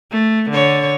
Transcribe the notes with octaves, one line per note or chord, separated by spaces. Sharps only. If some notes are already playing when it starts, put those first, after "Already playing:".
A3
D3 C#5